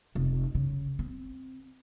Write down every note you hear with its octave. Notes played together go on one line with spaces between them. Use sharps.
F1
C#3
C4